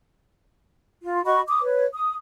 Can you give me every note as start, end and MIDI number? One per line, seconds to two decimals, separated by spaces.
1.03 1.22 65
1.25 1.40 66
1.25 1.40 75
1.25 1.40 83
1.25 1.40 85
1.47 1.61 86
1.47 1.61 87
1.62 1.85 71
1.62 1.85 73
1.94 2.15 87